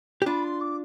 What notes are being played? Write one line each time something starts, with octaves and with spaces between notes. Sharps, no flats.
G4
D4 F4 B5
C6
D6